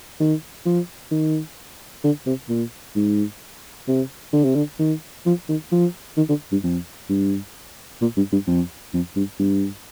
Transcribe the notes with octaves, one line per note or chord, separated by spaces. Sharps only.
D#3
F3
D#3
D3
C3
A#2
G#2
C3
D3
C3
D3
D#3
F3
D#3
F3
D#3
D3
G2
F2
G2
A#2
G2
G2
F2
F2
G2
G2